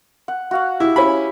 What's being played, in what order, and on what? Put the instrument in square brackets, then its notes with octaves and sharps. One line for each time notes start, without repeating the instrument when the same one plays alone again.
[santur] F#5
F#4 F5 F#5
[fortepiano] E4 [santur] G4
[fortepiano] C#4 E4 B5